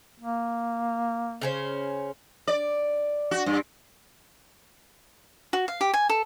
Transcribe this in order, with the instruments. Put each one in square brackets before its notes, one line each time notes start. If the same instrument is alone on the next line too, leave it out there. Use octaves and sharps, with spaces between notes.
[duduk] A#3
[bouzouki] C#3 C#4 C5
[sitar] D5
F#4
G2
[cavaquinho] F#4
F5
G4
G#5
A4